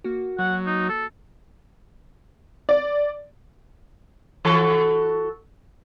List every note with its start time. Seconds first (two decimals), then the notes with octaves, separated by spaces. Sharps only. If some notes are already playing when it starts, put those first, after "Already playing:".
0.04 A#3 F#4
0.39 F#3 F#5
0.66 D#4
0.89 A4
2.69 D5
4.45 E3 F#4 A4